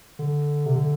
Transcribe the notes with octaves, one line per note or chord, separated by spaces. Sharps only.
D3
C3
D3